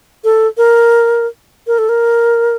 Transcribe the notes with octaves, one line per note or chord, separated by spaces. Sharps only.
A4
A#4
A#4
A4
A#4